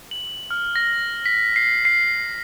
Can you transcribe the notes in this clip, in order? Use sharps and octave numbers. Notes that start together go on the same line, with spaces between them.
F#7
F6
A#6
B6
C7
C7